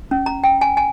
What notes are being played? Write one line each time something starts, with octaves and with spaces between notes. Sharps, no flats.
C#4
A#5
G5
G#5
G#5